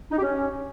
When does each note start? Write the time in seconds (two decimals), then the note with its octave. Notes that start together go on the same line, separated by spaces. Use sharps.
0.12 D#4
0.17 G4
0.23 C#4